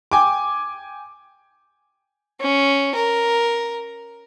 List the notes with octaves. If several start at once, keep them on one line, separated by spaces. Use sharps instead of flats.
G5 G#5 D6
C#4
A#4